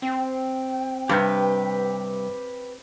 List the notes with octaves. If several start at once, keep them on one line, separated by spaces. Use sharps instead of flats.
C4 G5
G2 C3 G4 B4 G6